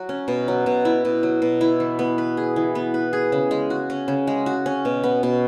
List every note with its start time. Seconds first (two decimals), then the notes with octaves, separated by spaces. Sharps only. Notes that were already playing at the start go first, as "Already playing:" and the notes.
Already playing: F#3 F#4
0.09 C#4
0.28 B2
0.48 F#3
0.66 B2
0.85 E4
1.05 B2
1.23 F#3
1.42 B2
1.61 E4
1.80 E3
1.99 B3
2.18 B4
2.37 G#4
2.56 E3
2.75 B3
2.94 B4
3.13 G#4
3.32 C#3
3.51 G#3
3.70 F#4
3.90 C#4
4.08 C#3
4.27 G#3
4.46 F#4
4.66 C#4
4.85 B2
5.04 B3
5.23 B2